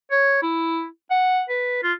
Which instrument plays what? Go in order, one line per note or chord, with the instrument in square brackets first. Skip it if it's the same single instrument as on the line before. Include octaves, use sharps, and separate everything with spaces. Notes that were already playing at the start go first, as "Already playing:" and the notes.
[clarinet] C#5
E4
F#5
B4
F4